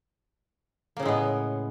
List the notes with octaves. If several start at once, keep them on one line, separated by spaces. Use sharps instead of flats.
A2 C#3 G#3 A#3 B3